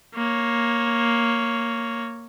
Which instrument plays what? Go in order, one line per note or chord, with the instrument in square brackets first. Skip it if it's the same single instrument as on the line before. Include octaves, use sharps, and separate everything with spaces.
[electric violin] A#3 C#5